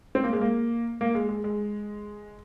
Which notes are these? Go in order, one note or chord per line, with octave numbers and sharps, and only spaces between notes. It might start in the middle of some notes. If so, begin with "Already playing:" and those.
C4
A#3
G#3
A#3
A#3
G#3
G#3
G#3